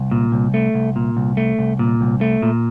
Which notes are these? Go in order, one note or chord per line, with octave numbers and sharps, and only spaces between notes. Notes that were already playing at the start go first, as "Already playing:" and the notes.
Already playing: C2
A#2
C2
A3
C2
A#2
C2
A3
C2
A#2
C2
A3
A#2